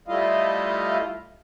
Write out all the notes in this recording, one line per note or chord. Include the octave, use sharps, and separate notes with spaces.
G3 A3 E4 F4 D#5 F5